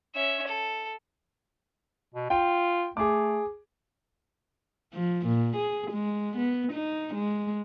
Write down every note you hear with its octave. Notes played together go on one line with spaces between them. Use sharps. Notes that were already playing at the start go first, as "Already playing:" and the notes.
C#4 E5
A4
B2
F4 G5
A3 G#4 D6
F3
A#2
G#4
G#3
B3
D#4
G#3